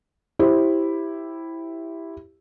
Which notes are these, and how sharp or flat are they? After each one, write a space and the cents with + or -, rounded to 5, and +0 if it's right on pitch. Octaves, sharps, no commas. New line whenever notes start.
E4 +0 G4 +0 C5 +20